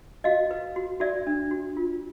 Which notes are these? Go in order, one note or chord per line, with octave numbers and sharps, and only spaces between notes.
F#4 D#5 F5
B4
F#4
F#4 D5 E5
D4
F#4
F4